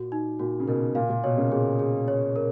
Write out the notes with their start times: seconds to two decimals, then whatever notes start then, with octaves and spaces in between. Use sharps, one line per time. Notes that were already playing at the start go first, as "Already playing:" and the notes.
Already playing: A#2 F#4
0.12 D#4
0.39 A#2 F#4
0.60 C#3
0.68 B2 A#4
0.95 A#2 F5
1.09 A#2
1.24 B2 C#5
1.37 A#2 C#3
1.51 A#2 C#3 G#4
1.79 G#4
2.08 C#5
2.36 A#4